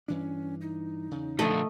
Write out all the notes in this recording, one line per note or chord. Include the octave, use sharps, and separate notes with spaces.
G2 E3 C#4 D4
D#4
E2 C#3
A#2 D3 F3 A3 D#5